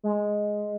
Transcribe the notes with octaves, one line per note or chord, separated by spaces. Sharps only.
G#3